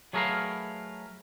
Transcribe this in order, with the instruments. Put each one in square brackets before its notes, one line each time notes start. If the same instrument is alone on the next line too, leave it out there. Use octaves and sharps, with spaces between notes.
[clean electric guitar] F#3 A3 G#4 A#4 B4 F5